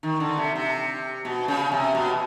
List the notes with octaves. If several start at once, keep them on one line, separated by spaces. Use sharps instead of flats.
D#3
D3
C3
C3
B2
C#3
C3
B2